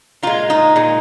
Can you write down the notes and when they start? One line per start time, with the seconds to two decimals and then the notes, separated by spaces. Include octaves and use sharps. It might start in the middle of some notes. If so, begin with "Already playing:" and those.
0.23 A#2 G#3 F4
0.50 D#4
0.76 A#2 G#3